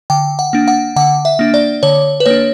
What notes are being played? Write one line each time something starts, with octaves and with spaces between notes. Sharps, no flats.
D3 G5
F#5
A#3 D4
F#5
D3 F#5
E5
A#3 D4
D5
D3 C#5
B4
A#3 D4 C#5